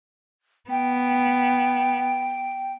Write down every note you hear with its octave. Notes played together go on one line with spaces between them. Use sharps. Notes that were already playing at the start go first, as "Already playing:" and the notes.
B3 G5